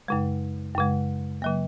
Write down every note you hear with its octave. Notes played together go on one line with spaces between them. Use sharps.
F#2 C#3 G#3
F#2 C#3 G#3
C#3 F#3 A#3